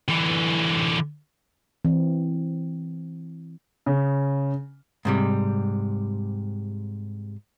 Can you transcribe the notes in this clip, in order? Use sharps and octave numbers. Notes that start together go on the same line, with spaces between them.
D3 E3
E3 C4
C#3
G#2 C3 G3